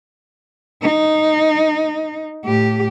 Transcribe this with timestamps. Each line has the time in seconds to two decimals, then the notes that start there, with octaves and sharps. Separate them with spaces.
0.82 D#4
2.45 A2 G4